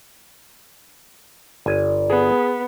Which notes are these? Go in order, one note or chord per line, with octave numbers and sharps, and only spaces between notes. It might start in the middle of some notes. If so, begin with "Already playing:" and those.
G1 D5 G#5
B3 G#4